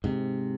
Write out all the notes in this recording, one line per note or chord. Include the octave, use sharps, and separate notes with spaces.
G#2 C3